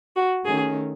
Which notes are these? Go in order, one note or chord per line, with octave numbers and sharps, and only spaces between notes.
F#4
D#3 A3 C#4 G#4